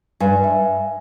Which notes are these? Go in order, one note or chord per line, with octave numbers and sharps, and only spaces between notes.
G2 G#5
E5